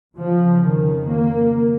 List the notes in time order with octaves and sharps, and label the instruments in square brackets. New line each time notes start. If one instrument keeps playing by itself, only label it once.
[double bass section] F2 C#3 F3
D#3
A#3